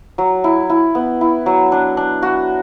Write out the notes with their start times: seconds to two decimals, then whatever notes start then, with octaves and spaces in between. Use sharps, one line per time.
0.18 F#3
0.44 E4
0.70 E4
0.95 B3
1.21 E4
1.46 F#3
1.72 D4
1.97 D4
2.22 F#4